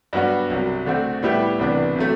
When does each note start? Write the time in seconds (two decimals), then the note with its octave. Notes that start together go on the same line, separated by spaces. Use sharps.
0.13 G2 F#3 B3 D4 F#4
0.50 C2 C3 F#3
0.86 D3 A3 C4 F#4
1.23 A2 G3 B3 E4 G4
1.59 C2 C3 E3 B3 D4
1.96 C3 F#3 A3